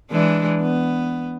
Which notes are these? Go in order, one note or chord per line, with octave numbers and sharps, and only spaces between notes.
E3 G#3 D4
B3